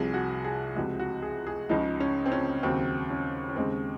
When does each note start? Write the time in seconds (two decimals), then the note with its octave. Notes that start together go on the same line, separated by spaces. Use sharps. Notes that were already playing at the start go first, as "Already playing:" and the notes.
Already playing: C2 C3 F3 G#4
0.14 F#4
0.44 G#4
0.75 C#2 C3 F3 G#3 F#4
0.99 F#4
1.22 G#4
1.47 G#4
1.69 C#2 C#3 F3 G#3 D#4
2.00 C#4
2.26 C4
2.32 C#4
2.63 D#2 C#3 F#3 C4
3.10 C#4
3.49 C#4
3.56 D#2 C#3 G#3 C4